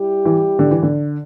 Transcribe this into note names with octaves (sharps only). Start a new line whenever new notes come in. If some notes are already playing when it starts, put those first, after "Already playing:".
Already playing: G3 E4 G4
E3
D3
E3
D3